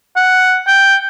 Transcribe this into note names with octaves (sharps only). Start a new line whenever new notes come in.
F#5
G5